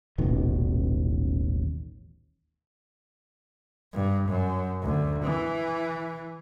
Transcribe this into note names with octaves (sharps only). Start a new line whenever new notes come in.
D#1 A1 B2 D#3
G2
F#2
D2
E3